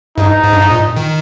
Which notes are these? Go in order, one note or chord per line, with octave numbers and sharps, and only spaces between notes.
G2 D#4
G#2
G2
G#2
A#2
D#3